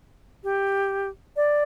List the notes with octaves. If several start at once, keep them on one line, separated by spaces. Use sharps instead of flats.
G4
D5